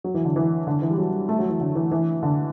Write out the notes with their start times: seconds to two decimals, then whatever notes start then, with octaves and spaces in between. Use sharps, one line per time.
0.04 F#3
0.14 E3
0.25 D3
0.36 E3
0.67 D3
0.82 E3
0.90 G3
0.98 F#3
1.13 G3
1.29 A3
1.39 F#3
1.49 E3
1.61 D3
1.76 E3
1.91 E3
2.23 D3